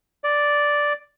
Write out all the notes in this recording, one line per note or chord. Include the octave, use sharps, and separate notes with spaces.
D5